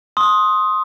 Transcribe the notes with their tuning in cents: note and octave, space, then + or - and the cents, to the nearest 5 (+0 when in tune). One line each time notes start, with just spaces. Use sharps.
C6 +15 D#6 +10